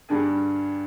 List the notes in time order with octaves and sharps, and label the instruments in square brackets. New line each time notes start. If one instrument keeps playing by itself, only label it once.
[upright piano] G2 D3 G3 D4 G#4